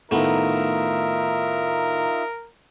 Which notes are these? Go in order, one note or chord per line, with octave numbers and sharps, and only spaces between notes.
A2 D#3 A3 B3 D#4 F4 A#4 E5